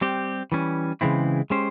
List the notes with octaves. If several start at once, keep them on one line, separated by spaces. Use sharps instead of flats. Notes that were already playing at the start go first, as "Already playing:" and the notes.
G3 C4 G4
E3 G3 C#4
C#3 E3 G#3 C4 E4
G#3 C#4 G4 C5